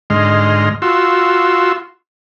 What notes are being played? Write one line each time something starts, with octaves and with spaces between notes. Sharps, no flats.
G#2 D3 G#3 D#5 C6 F6
F4 F#4 C6 E6